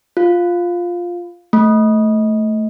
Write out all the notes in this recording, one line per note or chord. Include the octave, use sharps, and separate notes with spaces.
F4
A3